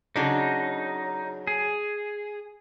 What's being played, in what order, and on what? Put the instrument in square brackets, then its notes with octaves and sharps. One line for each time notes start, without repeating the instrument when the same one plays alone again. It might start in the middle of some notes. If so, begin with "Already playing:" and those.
[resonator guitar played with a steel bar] C#3 F#3 D4 [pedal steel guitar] D#4
[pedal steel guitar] G#4